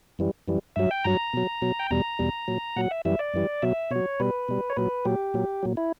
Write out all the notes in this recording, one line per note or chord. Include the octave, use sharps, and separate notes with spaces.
F#2 E3 G3
F#2 E3 G3
G2 F#3 E5
G5
G2 F#3 A#5
B2 F#3
B2 F#3
G5
E2 B2 G3 A#5
E2 B2 G3
A#2 F#3
A#2 F#3 F#5
E5
F#2 E3 G3 E5
D5
F#2 E3 G3
B2 F#3 E5
B2 F#3 C#5
B2 G3 B4
B2 G3
C#5
A#2 F#3 B4
A#2 F#3 G4
A#2 F#3
A#2 F#3
E4